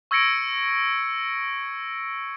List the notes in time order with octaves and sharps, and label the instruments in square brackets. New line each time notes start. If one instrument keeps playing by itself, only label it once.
[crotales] C#6 E6 G#6 A#6 C#7 D7